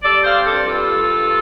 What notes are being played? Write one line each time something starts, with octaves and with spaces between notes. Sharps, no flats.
G3 A4 D5
C4 C5 F5
G2 A4 D5
G3 F4 A4
G2
G2